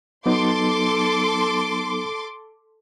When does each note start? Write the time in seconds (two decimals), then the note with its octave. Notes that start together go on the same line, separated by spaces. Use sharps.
0.26 F#3 B3 D#4 A4 C6 D6